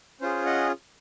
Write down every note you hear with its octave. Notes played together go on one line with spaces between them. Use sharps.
C#4 F4 G#4 C5
D#5 F#5